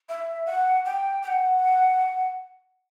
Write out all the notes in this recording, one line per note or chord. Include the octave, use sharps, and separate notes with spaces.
E5
F#5
G5
G5
F#5